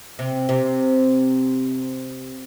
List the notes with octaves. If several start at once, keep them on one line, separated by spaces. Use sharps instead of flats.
C3
C3